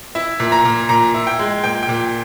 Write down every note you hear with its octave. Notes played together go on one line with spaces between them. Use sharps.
E4 E5
A#2
A#5
A#2
A#2 A#5
E4
G5
G#3
A#2 G5
G5
A#2